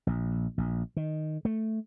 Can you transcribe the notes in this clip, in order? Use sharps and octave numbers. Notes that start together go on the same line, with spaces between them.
A#1
A#1
D#3
A3